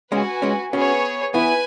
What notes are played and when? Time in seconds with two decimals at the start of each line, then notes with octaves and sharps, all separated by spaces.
0.12 G#3 C#4 F#4 B4 G#5
0.42 G#3 C#4
0.73 B3 C#4 F#4 G#4 C#5
1.34 B3 E4 B4 G#5